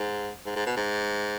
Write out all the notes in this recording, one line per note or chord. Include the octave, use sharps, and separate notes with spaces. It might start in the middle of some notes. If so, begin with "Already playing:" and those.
Already playing: G#2
G#2
G#2
B2
G#2